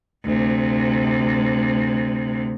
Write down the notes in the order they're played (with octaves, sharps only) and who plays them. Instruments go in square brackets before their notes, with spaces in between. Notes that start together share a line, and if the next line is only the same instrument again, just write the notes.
[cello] D2 C3